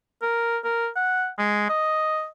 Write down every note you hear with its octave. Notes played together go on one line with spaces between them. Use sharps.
A#4
A#4
F#5
G#3
D#5